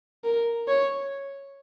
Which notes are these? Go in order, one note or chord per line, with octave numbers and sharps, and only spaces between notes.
A#4
C#5